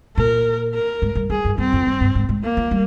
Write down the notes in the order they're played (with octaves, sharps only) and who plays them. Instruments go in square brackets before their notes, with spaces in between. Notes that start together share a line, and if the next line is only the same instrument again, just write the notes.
[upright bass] A#2 [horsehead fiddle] A#4
[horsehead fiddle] A#4
[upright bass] G#2
G2
[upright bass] G2 [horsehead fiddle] G#4
[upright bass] G2
[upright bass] G2 [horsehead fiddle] C4
[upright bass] F2
G2
G2
G#2
G#2
[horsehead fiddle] A#3
[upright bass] F3
G3